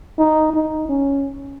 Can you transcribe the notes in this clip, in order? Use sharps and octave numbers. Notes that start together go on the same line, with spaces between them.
D#4
D#4
C#4